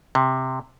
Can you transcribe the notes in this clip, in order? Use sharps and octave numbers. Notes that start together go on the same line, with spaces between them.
C3